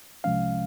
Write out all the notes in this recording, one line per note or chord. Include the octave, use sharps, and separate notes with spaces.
C2 C3 F3 G#3 C#4 F5